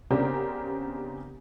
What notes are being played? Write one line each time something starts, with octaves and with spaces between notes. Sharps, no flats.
C#3 B3 C4 D4 G4 A#4